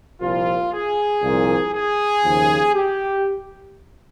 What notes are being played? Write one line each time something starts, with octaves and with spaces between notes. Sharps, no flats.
C2 A#2 F3 F4
G#4
C2 A#2 F3
G#4
D#2 C#3 F3
G4